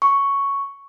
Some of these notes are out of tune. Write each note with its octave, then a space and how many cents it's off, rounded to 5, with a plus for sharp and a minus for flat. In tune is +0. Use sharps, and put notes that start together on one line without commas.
C#6 +5